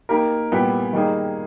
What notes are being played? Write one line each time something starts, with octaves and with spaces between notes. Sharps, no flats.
A#3 D#4 G4 A#4
A#2 G3 B3 E4 G4
D#3 G3 A#3 D#4 G#4